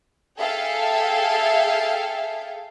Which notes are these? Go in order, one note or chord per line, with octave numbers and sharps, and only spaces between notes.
G#4 A4 E5 F5 G5